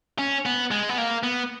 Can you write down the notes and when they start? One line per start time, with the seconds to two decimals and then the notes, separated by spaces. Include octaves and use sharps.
0.19 C#4
0.46 B3
0.71 G#3
0.89 B3
0.98 A#3
1.23 B3